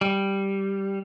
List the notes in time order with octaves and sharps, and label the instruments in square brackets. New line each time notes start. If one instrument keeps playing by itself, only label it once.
[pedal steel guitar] G3